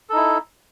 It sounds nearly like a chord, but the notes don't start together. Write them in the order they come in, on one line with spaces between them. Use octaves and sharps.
A4 D#4 E4